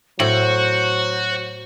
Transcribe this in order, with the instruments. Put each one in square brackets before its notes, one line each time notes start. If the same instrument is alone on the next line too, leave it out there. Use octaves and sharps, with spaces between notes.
[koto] A2 [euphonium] F#3 [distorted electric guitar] F#4 [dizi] C5